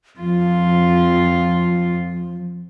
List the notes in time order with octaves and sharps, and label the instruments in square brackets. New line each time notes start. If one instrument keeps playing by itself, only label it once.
[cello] F2 F4 [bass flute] F3